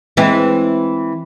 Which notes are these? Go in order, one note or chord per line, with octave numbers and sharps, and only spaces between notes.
E3 G#3 C4